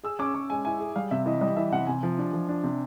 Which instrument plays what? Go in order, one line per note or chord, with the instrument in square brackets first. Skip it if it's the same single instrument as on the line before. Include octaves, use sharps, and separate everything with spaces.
[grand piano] G#4 [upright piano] E6
[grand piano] C#4 [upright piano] D6
[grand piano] C#4 [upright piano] C#6
[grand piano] G#3 [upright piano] G#5
[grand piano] E4 [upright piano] G#5
[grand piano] G#4
[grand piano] G3 [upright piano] F5
[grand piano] C3 [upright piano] E5
[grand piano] E3 [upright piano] D#5
[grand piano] G3 [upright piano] D#5
[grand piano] E3 [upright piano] E5
[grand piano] C3 [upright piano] F#5
[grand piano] C3 [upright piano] G#5
[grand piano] F3
D4
F3
D4
C3